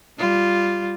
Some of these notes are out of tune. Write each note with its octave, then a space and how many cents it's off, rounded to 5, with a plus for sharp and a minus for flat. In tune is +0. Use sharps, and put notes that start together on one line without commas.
G3 +0 F4 -5